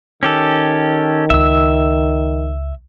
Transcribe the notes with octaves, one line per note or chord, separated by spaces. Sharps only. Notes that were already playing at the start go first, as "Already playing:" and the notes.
D#3 C#4 G4 A4
C#2 E5 E6